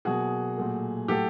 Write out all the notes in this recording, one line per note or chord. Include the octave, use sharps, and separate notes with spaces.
B2 F#3 A#3 F#4 G#4
A#2 F#3 A3
A2 F#3 A3 G4 A4